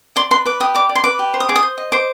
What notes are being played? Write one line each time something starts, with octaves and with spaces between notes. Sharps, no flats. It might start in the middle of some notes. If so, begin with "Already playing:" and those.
D5 C6
B4 C6
B4 D6
G4 D#6
D5 D6
D5
C6
B4 D6
G4
C5
D#6
G#4 D6
D#6
C5
D#5
C5 D6